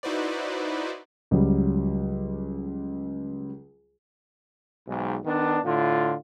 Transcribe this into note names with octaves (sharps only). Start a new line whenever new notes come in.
D#4 E4 F#4 B4 C5 D5
C#2 F#3 G3
B1 G#2
D#3 B3 D4
A2 D3 F4